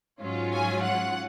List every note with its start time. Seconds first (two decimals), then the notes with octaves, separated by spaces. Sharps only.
0.21 G#2 F#3 C#4 F4
0.53 G#5
0.83 F#5